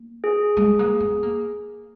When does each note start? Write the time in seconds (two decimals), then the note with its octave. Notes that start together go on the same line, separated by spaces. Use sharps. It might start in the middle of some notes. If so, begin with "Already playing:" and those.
Already playing: A#3
0.24 G#4
0.57 G#3
0.79 A#3
1.00 B3
1.23 A#3